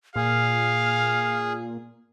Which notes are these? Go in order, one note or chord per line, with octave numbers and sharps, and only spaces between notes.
A#2 G#4 F5 F6